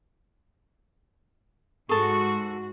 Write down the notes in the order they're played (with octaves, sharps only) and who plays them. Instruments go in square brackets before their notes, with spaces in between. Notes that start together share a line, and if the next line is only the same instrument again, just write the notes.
[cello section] G#2 F#4 [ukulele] G#4 A4 [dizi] C#6